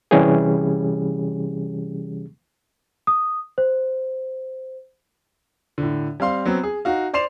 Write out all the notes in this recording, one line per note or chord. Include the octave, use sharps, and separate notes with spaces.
C3 E3 G3 C#4 G4 G#4
D#6
C5
A2 D3
G3 C4 F5 C6
F#3 B3 C4
G#4
D#4 F#4 F5
C5 D5 C6 C7 E7 F7